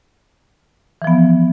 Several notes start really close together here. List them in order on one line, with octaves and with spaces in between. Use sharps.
E3 F3 B3